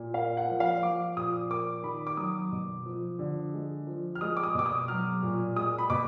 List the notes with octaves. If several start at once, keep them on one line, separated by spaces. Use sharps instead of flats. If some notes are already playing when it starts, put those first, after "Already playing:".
Already playing: A#2
A#3 F5
F#5
F3
F5
F3 D6
A#2 D#6
A#3 D6
D#3 B5
D6
F#3 D#6
B2
F3
D3
G#3
F3
F6
G#3 D#6
D6
D#6
B2 D6
D#6
F#3 F6
A#2
G#3 D#6
B5
B2 D6